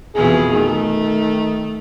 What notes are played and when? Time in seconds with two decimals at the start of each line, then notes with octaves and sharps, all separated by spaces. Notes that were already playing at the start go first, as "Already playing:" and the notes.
0.15 F2 B2 E3 G#4
0.52 D#3 A3